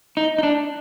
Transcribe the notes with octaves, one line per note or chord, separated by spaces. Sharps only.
D#4
D#4
D4